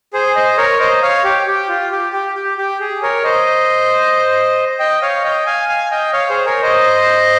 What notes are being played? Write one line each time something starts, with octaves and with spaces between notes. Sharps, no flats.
G#4 C5
C5 D#5
A#4 C#5
C5 D#5
C#5 F5
G4
G4
F4
G4
G4
G4
G4
G#4
A#4 C#5
C5 D#5
D#5 G5
C#5 F5
D#5 G5
F5 G#5
F5 G#5
D#5 G5
C#5 F5
G#4 C5
A#4 C#5
C5 D#5